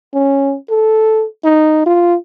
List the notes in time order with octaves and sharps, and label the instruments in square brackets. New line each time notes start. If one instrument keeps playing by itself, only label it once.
[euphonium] C#4
A4
D#4
F4